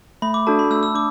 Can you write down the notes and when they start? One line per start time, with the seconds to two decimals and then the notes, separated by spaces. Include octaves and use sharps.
0.22 A3 B5
0.34 D6
0.47 D4 F#4 A4 A5
0.59 B5
0.71 A3 E6
0.83 E6
0.95 D4 D6